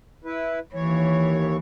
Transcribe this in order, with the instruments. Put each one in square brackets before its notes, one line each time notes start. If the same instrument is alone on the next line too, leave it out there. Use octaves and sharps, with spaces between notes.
[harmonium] E4 B4
[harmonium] D#2 C#5 [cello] E3